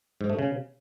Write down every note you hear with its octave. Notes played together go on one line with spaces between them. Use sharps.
G#2
A3
C#3